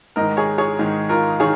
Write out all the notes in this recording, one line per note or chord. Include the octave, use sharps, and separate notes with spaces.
G#2 D#3 A#4 D#5
G#4 C#5
G#4 C#5
G#2 D#3
F4 A#4
D#3 G#4 C#5